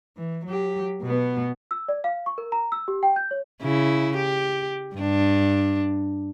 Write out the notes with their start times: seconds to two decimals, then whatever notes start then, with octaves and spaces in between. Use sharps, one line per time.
0.17 E3
0.46 F#3 G4
1.02 B2 B3
1.71 E6
1.88 D5
2.04 F5
2.26 C#6
2.38 A#4
2.52 A#5
2.72 E6
2.88 G4
3.03 G5
3.16 G6
3.31 C#5
3.62 C#3 E4
4.17 G4
4.96 G2 D4